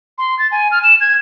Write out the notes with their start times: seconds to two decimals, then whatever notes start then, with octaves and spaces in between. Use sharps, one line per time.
0.18 C6
0.39 A6
0.52 G#5
0.71 F6
0.84 E7
1.01 G#6